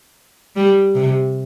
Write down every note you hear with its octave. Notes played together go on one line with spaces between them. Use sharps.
G3
C3